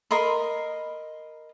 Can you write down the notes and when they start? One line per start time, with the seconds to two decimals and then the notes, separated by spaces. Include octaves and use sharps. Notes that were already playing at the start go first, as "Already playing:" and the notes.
0.11 A#4 D#5 B5 C6